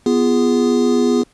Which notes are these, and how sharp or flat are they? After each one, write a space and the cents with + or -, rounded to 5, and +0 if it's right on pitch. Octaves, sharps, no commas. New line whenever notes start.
B3 +0 F4 -20 G#4 -10